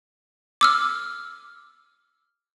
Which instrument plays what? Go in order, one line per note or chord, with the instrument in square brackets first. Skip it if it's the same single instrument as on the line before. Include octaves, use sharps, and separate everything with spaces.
[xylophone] D6 E6 F6